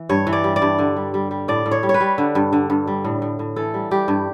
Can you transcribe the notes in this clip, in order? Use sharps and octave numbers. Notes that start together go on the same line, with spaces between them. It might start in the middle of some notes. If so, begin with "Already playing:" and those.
Already playing: E3
G2 C#5
E3
D5
G3
D5
G2
D3
G3
G3
G3
A2 D5
A2
C#5
G3
C#5
B4
G3
D3
G2
D3
G2
G3
A2
A2
A2
E3 A4
G3
G3 G4
G2